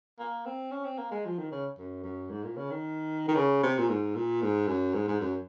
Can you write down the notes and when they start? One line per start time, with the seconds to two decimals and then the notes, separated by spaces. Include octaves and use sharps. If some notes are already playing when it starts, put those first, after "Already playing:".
0.19 A#3
0.46 C4
0.71 C#4
0.85 C4
0.98 A#3
1.12 G#3
1.26 F3
1.39 D#3
1.52 C#3
1.78 F#2
2.04 F#2
2.30 G#2
2.44 A#2
2.57 C#3
2.71 D#3
3.28 D#3
3.36 C#3
3.63 C3
3.78 A#2
3.89 G#2
4.15 A#2
4.42 G#2
4.68 F#2
4.94 G#2
5.08 G#2
5.21 F#2